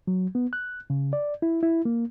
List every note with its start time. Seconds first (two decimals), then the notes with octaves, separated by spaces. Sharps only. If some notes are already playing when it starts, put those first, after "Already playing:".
0.07 F#3
0.35 B3
0.53 F#6
0.90 C#3
1.13 D5
1.42 E4
1.63 E4
1.85 A#3